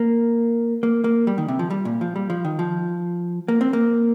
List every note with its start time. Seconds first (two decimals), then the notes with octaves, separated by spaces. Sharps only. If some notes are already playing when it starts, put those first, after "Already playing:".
Already playing: A#3
0.83 A#3
1.04 A#3
1.27 G3
1.38 D#3
1.48 C3
1.59 F3
1.71 G3
1.85 A#2
2.01 F3
2.16 G3
2.30 F3
2.45 D#3
2.59 F3
3.48 A#3
3.61 C4
3.73 A#3